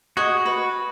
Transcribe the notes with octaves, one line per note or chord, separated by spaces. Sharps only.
F#4 G#4 D#5 G#5
B4